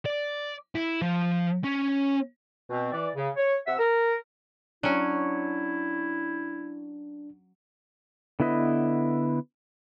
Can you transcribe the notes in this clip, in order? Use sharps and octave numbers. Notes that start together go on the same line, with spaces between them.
D5
E4
F3
C#4
B2 C4
E3 D5
C#3
C#5
C3 E5 F#5 E6
A#4
F#3 C#4 D4 E4
D3 B3 E4 B4 D#5